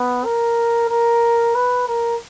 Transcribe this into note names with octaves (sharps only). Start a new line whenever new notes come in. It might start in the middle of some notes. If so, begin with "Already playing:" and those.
Already playing: B3
A#4
A#4
B4
A#4